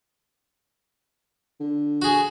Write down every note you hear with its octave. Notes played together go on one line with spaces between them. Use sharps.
D3
F#4 G#4